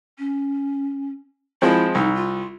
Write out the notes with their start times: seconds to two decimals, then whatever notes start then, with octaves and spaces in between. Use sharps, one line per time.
0.18 C#4
1.62 F3 G#3 C4 E4
1.95 C2 D#4
2.15 F4